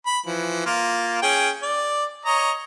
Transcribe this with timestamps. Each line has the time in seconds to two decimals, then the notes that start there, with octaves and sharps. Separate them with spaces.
0.06 B5
0.26 E3 F3
0.66 A#3 F4
1.23 C#4 G#4 G5
1.62 D5
2.25 C#5 D#5 A#5